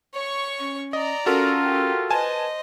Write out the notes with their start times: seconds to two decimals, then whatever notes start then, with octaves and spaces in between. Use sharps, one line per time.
0.14 C#5 C#6
0.59 C#4
0.93 D5 D#5 A#5
1.26 C#4 F4 F#4 A4 A#4
1.62 G4
2.10 B4 C5 D#5 G#5 A5